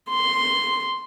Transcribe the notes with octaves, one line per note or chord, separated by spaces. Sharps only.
C6